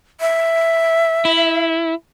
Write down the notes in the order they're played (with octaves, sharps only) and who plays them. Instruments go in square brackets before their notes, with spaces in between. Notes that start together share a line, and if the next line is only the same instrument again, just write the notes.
[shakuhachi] E5
[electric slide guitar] E4